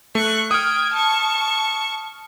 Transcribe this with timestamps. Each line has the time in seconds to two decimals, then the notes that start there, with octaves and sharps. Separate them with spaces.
0.15 A3 C#6 F#6
0.51 G5 D#6 F6 G#6
0.93 A5 C#6